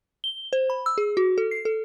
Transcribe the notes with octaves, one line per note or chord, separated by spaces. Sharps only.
G7
C5
B5
E6
G#4
F#4
A4
C7
A4